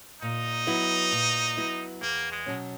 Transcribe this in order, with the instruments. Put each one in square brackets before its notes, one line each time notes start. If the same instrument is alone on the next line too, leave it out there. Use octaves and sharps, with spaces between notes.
[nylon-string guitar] A#2 [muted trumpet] D#4
[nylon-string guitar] F#3 B3 E4
A#2
F#3 B3 E4
[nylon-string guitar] E2 [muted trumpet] A#3
[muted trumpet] G#3
[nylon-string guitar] B2 F#3 C#4